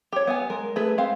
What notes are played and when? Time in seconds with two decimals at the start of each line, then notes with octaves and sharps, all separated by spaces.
0.12 G4 C#5
0.27 B3 E5 G#5
0.50 G#3 A#4
0.76 A3 G#4 B4
0.98 G#3 C4 F5